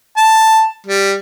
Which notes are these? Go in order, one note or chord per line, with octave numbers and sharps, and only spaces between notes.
A5
G3